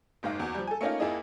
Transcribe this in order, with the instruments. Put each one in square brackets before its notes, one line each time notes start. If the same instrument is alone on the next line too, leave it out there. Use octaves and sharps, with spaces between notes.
[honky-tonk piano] F#1 G#2 D#4 F5
E2 F#4
F3 G3
A4 G#5
A3 A#3 C#4 D#4 F4
F2 A#3 E4 G#4 D#5